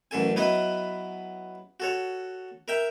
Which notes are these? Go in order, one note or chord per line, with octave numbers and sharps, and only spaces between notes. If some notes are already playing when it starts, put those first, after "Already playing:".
A1 F#2 A4 G#5
F#3 B3 E4 B4 D#5
F#4 A4 C#5
A#4 E5 G5